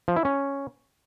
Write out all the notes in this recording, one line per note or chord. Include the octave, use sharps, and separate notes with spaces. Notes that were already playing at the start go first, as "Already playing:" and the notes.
F3
E4
C#4